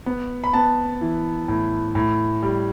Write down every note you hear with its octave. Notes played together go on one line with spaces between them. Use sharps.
B3
B5
B3 A5
E3
A2
A2
G3